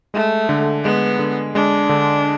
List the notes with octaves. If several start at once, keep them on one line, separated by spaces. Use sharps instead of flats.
G#3 A3
D3
G#3 B3
D3
G#3 D4
D3